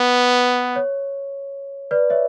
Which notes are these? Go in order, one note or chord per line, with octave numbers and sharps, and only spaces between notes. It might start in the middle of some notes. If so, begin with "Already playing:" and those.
Already playing: B3 B4
C#5
B4 D5
C#5 E5